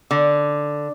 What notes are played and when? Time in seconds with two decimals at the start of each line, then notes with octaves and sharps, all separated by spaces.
0.11 D3